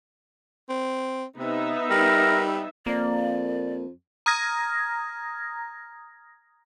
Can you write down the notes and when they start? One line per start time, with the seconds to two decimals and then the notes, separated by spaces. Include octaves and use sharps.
0.69 C4
1.38 C3 B3 D#4 E5
1.90 G3 A#4
2.86 F2 A#3 D5
4.26 A#5 D#6 F6 G#6 A#6